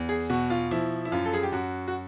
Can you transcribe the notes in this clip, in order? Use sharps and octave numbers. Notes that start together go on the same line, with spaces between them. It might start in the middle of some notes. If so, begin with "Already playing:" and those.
Already playing: E2
G#4
B2 F#4
F4
F3 E4
E4
F#2 F4
A4
G#4
G4
F#2 F#4
F#4